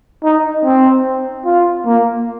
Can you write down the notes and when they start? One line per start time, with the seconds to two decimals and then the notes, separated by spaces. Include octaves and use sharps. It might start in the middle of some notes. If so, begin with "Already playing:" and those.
0.24 D#4
0.65 C4
1.45 F4
1.86 A#3